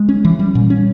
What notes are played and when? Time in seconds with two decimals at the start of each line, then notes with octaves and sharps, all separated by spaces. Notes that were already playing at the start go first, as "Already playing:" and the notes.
Already playing: G#3
0.09 C#4
0.25 E3
0.39 G3
0.55 A#2
0.70 C#4